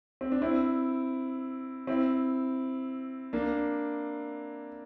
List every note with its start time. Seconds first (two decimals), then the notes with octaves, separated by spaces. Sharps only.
0.21 C4
0.32 D4
0.42 C4 E4
1.87 C4 E4
3.33 A#3 D4